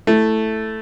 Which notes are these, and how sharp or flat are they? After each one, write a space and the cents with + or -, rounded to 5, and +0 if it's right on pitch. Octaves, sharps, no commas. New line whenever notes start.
A3 +0 E4 +0